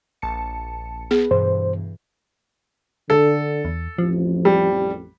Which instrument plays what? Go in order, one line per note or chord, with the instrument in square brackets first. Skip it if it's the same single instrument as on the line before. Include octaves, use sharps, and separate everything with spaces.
[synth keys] A#1 A5 C#7
[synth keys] B3 [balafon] G#4
[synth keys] G2 B2 E3 [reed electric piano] C5
[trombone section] D3 [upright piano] A4
[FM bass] E2
[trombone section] A1 F2 [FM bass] F3
[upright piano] G3